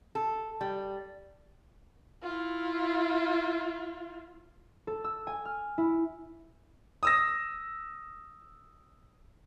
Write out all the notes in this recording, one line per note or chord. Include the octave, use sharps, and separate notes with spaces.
A4
G3
E4 F4
A4
E6
G#5
F6
E4
D#6 E6 A#6